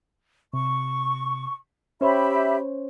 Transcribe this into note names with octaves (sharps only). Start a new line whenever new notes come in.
C3 C#6
C#4 G4 C5 C#5 E5 B5